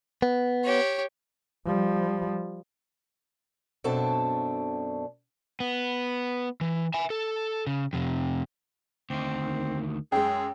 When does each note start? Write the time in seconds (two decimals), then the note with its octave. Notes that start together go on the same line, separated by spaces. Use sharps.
0.22 B3
0.64 G4 C#5
1.66 F3 G3
3.84 F#2 B2 C4 D4 A4 A5
5.60 B3
6.61 E3
6.94 E5 G#5
7.10 A4
7.67 C#3
7.93 F2 C3
9.10 D2 D#3 C4
10.12 F#2 G#3 G#4 G5